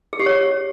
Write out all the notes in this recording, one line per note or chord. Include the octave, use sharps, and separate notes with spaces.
G#4
G4
C#5